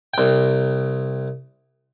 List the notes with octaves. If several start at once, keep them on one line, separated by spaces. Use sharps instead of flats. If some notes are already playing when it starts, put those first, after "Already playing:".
C2 G5